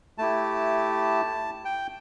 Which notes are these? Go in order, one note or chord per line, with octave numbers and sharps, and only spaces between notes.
A3 E4 G4 A5
G5